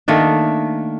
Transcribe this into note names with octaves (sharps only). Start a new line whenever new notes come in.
D#3 A3 A#3 D4